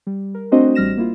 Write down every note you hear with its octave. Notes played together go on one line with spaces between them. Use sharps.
G3
A#4
A3 C4 D4 F#4 C5 D#5
A1 G3 F6 A#6 E7
A#3 E4 F4